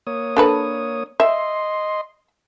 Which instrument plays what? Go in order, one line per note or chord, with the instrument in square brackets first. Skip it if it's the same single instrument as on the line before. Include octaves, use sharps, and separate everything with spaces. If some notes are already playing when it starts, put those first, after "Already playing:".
[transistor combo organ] A#3 C#5 D#6
[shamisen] D4 A4 B4
[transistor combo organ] D#5 C6 [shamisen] E5